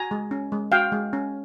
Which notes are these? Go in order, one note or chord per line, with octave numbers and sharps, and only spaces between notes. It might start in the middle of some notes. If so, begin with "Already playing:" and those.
Already playing: F#4 G#5 A#5
G#3
C#4
G#3
F#4 F5 G5
G#3
C#4